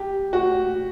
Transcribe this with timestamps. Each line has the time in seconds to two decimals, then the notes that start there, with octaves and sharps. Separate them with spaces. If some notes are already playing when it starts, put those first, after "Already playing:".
Already playing: G4
0.33 F#4